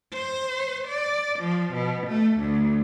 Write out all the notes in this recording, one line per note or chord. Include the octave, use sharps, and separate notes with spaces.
C5
D5
F3
B2
A3
D2